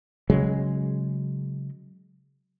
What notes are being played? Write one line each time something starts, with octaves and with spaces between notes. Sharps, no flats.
C#3 F#3 G#3